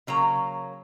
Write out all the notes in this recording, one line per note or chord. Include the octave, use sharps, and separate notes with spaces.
C#3 F#3 A#3 A#5